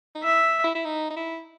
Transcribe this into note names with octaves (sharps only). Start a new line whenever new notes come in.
D#4
E4 E5
E4
E4
D#4
D#4
E4